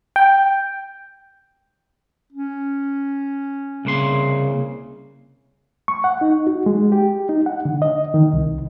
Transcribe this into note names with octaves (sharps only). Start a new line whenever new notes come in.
G5
C#4
C2 C#3 A#3 C6
C#6
F#5
D#4
F#4
G#3
G4
D#4
F#5
D3
D#5
D#3
C2